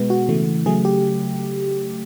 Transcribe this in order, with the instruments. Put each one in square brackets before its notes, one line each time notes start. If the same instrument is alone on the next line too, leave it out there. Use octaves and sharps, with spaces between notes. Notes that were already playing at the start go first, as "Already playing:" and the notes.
Already playing: [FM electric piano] B2 G#3 B3
F#4
C#3 E3 A3
C#3 F#3 A3 G#4
G4